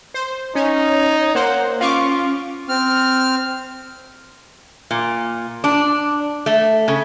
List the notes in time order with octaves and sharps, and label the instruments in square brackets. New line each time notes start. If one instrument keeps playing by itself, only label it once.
[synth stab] C5
[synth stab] C#4 [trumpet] D#4 [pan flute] C#5
[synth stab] A#3 C5 [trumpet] F#5
[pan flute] C#4 [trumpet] F4 [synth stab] F5 C#6 D6
[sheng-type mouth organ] C4 F6
[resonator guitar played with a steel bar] A#2
D4
A3
C#3